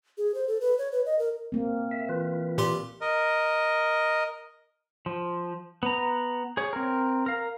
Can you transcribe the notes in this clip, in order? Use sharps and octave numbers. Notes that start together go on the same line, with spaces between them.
G#4
C5
A4
B4
C#5
B4
D#5
A#4
A#3 C4
E5
E3 F4 B4
A#2 G4 C6
A#4 D#5
F3
B3 A#5
G#4 C#5
C4 A#4
A#4 F5